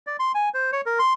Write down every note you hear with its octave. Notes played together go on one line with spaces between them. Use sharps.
D5
C6
G#5
C5
C#5
A#4
C6